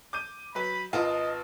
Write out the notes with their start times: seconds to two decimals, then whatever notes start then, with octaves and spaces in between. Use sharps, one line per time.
0.13 D6 G6 D#7
0.55 F#3 B4 B5
0.93 G#1 F4 A#4 B4 D#5 F5 A5